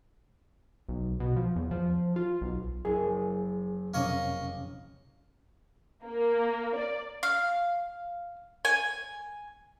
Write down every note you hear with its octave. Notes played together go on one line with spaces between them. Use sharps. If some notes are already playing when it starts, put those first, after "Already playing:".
B1
B2
F3
E2
F3
F4
B1
F#1 G#4
F2 C3 A#3 C#4 C#5 D#5
A#3
D5
F5
G#5